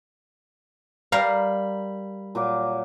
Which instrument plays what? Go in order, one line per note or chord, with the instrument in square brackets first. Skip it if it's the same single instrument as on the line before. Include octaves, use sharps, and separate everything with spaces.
[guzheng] G3 A#4 F5 [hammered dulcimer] B5
[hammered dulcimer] A#2 F#3 D6